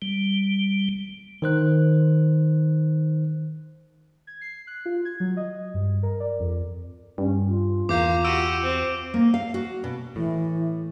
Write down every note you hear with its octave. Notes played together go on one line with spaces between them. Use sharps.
G3
D#3 C5 F#6
G#6
C7
F#6
F4
G#6
F#3
D#5
G2
A#4
D5
F2
G2 C#4
F4
E2 A#3 F5 D6 G6
F#4 G4 E6 D7 D#7
C4
A#3
F5
F#4
B2
A2 E3